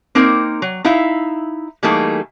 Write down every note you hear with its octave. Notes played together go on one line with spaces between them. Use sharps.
A#3 C4 D#4 A#4
F#3
D#4 E4 E5 F5
E3 G3 A3 A#3 D#4 G#4